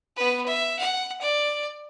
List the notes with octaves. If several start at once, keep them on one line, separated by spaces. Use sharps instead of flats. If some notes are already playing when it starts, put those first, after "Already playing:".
B3 B4
E5
F#5
D5